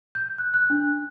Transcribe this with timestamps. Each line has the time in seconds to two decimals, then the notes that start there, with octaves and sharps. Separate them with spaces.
0.15 G6
0.38 F#6
0.54 F#6
0.70 D4